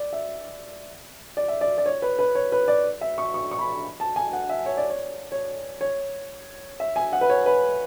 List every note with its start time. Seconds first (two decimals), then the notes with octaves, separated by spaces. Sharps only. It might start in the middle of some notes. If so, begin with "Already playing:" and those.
Already playing: D5
0.13 E5
1.37 D5
1.48 E5
1.61 D5
1.78 D5
1.86 C#5
2.02 B4
2.19 B4
2.35 C#5
2.52 B4
2.68 D5
3.01 E5
3.18 C#6
3.34 C#6
3.51 C#6
3.59 B5
4.00 A5
4.16 G#5
4.33 F#5
4.49 E5
4.66 C#5
4.77 D5
4.90 C#5
5.32 C#5
5.81 C#5
6.80 E5
6.96 G#5
7.13 F#5
7.21 B4
7.30 C#5
7.46 B4